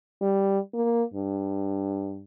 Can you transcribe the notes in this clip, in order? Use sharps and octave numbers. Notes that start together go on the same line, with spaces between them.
G3
A#3
G2